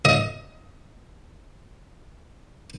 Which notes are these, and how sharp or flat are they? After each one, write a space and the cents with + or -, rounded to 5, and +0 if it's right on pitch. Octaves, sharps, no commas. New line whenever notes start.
D#5 +25